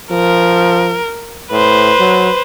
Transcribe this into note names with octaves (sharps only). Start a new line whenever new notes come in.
F3 A#4
A2 B4 C5
F#3